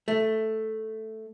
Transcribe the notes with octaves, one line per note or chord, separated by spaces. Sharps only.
A3